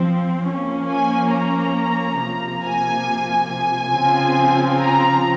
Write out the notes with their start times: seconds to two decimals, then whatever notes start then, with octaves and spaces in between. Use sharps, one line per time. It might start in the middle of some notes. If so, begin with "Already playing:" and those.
Already playing: F3 C4
0.47 F3 A#3 C#4
0.91 G#5
1.34 A#5
2.21 C3 F3 A#3
2.64 G#5
3.51 G#5
3.95 C#3 F3 C4
4.81 A#5